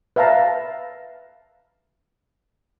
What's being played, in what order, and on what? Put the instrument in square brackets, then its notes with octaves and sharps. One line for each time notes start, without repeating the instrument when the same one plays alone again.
[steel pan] B4 E5 F5 A5 A#5